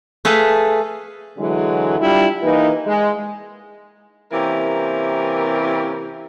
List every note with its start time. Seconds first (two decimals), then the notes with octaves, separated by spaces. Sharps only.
0.25 A3 G#4 A4 B4 F5
1.38 D3 E3 F#3 G#3
1.99 G3 D4 E4 F4
2.42 E3 A#3 D#4 B4
2.86 G#3
4.32 C3 E3 A#3 C#4 G4 A#4